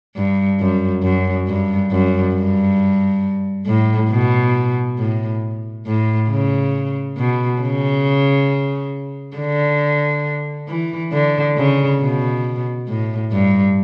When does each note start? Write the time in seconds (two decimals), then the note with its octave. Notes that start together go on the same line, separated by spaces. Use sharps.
0.16 G2
0.60 F#2
1.03 F#2
1.48 G2
1.91 F#2
2.35 G2
3.66 A2
4.10 B2
4.98 A2
5.87 A2
6.30 C#3
7.18 B2
7.62 C#3
9.37 D3
10.69 E3
11.12 D3
11.57 C#3
12.01 B2
12.88 A2
13.32 G2